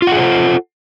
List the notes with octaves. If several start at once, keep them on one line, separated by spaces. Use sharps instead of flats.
F4 G#4 A4 C5 F#5